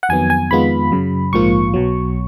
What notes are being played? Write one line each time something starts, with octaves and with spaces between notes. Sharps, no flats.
F#5
F2 D#3 F#3 B3 G#5
G#5
F2 D#3 G#3 B3 F4 B5
F#2 C#3 F#3
A#1 G#2 F3 A#3 F4 C#6
B1 B2 F#3